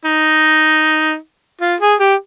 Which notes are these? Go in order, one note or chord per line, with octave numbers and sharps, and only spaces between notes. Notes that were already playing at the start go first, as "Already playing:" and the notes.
D#4
F4
G#4
G4